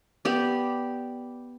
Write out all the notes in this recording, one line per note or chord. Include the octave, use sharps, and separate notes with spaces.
B3 G4 D5